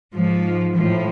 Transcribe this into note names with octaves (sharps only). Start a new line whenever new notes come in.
G#2 F3
A2 F3